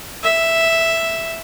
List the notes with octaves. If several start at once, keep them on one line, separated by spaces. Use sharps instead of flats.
E5